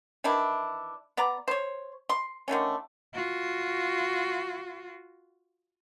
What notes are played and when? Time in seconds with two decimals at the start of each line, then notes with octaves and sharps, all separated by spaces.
0.24 D#3 E3 D4 E4
1.17 B3 D5 A#5
1.48 C5 C#5
2.09 C6
2.48 D3 D#3 A3 C#4
3.14 F4 F#4